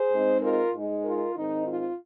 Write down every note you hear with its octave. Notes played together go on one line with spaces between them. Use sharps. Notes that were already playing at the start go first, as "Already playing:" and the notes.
Already playing: G#4 C5
G#2 G#3 C4 D#4
F4 A#4
G#2 G#3 D#4
F4 A#4
G#2 D#3 C4 D#4
F4